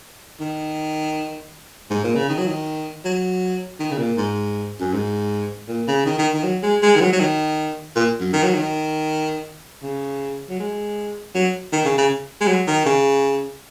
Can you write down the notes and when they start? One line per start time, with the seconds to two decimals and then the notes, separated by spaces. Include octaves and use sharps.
0.40 D#3
1.90 G#2
2.04 A#2
2.16 C#3
2.29 D#3
2.38 F#3
2.48 D#3
3.05 F#3
3.80 D#3
3.92 C#3
3.99 A#2
4.17 G#2
4.80 F#2
4.94 G#2
5.68 A#2
5.88 C#3
6.06 D#3
6.19 D#3
6.34 D#3
6.43 F#3
6.63 G#3
6.82 G#3
6.96 D#3
7.01 F#3
7.13 F#3
7.20 D#3
7.96 A#2
8.20 F#2
8.33 D#3
8.43 F#3
8.54 D#3
9.83 C#3
10.50 F#3
10.60 G#3
11.35 F#3
11.72 D#3
11.85 C#3
11.98 C#3
12.41 G#3
12.48 F#3
12.67 D#3
12.86 C#3